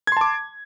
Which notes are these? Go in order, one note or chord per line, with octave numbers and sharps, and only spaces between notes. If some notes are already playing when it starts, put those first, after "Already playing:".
A5 C6 D6 G#6